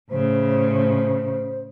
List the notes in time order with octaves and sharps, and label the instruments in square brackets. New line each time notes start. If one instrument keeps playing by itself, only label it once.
[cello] A2 C#3 [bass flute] C5